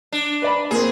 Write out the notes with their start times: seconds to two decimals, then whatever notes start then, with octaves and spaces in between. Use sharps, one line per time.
0.12 D4
0.42 B4 D5 B5
0.71 A#2 A#3 C4 G#4